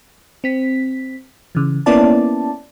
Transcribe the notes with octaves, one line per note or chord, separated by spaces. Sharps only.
C4 B6
C#3 E3
A#3 B3 C#4 E4 D5 A5